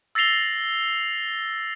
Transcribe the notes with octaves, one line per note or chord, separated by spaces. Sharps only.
E6 A6 A#6 C7 F7 G7